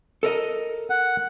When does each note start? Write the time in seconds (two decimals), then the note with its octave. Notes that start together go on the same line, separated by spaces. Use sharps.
0.23 A4 A#4 D#5
0.90 F#5